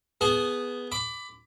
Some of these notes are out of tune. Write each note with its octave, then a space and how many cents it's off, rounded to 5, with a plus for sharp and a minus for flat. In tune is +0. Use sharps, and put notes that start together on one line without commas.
B3 +0 G#4 -5 A5 -45
B5 +20 D6 -5